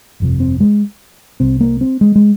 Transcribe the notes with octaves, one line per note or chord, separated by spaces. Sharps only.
G1 F2 C3
C4
G#3
C2 C3 C4
A#3
C4
G#3
G#3